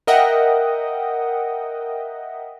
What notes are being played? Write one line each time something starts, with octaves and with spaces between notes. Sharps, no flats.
A#4 D#5 E5 F#5 G5